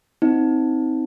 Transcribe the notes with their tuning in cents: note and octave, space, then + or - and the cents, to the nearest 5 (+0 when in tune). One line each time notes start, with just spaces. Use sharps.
C4 +0 D#4 +25